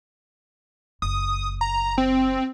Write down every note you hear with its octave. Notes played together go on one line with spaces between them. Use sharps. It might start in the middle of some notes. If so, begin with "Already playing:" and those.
F#1 D#6
A#5
C4